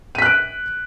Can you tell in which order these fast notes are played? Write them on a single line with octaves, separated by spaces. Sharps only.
D#7 B6 F#6 D7